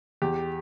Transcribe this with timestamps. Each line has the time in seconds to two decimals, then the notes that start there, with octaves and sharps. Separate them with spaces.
0.22 E2 G4